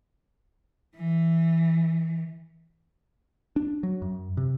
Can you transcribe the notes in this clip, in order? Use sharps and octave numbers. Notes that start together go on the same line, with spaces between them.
E3
D4
F#3
F#2
C3